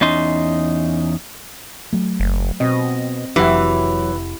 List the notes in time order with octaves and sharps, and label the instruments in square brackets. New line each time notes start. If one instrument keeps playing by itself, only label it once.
[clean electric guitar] E2 C#4 D#4 C6
[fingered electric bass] F#3 A3
[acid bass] F#1
[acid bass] B2 [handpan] C4 D#5
[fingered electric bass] F1 D4 [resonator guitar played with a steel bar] E3 [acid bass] F#3 [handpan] G4 F#5